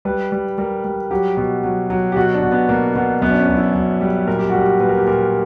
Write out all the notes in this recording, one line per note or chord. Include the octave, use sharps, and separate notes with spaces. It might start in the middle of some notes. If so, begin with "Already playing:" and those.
G3 B4
G3
G3 A#4
G3
F#3 G4
B2
F#3
F#3
G4
B2 F#4
D4
B2
B3
B2 A#3
B2 B3
F#2 B3
D4
C#4
F#2
E4
F#2
G3
A#2 A#4
G4
G3 F#4
G4
A#2 B4
A#4
G4
A#2 A#4